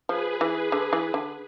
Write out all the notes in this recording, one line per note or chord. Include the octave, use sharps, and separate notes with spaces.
F3 G#4 B4
E3
D3
E3
D3